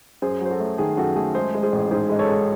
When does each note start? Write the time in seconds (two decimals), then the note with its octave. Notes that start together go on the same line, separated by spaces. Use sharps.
0.22 F#2 G#4 C5
0.41 F#3 C5
0.50 F#4 A4
0.60 A3
0.78 D#3 G#4
0.97 F#2 F#4 A4
1.16 A3 G#4
1.35 G#3 G#4 C5
1.54 G#3
1.63 G#4 C5
1.72 A1
1.91 G#2 G#4 C5
2.09 G#3 D#5
2.19 A4 C#5
2.29 G#3